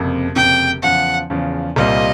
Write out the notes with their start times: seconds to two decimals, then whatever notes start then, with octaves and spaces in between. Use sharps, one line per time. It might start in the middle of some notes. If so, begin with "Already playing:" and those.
Already playing: F#1 F2 C3
0.35 F#1 F2 C3 G5
0.82 E2 C#3 F3 F#5
1.30 E2 C#3 F3
1.76 C2 A#2 G3 C4 F4 D#5